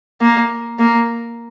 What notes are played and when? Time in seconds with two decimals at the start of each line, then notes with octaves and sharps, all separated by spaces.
0.21 A#3
0.79 A#3